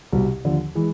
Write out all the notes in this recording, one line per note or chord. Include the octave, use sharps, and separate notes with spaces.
C2 B2 G3
D#2 D3 F3
E3 G#3